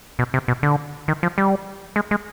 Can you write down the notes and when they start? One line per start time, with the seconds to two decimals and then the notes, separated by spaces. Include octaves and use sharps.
0.19 B2
0.34 C3
0.48 B2
0.63 D3
1.08 D#3
1.23 F3
1.38 G3
1.96 G#3
2.11 G#3